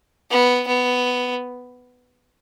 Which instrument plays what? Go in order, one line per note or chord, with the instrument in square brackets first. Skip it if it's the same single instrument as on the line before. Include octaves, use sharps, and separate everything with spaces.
[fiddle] B3
B3